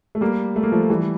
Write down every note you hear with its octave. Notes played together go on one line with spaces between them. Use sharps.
A3
G3 A#3
A3
A#3
F3 A3
E3 G3